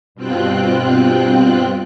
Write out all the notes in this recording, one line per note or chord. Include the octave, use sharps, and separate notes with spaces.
G2 B2 C4 F4 G5 F#6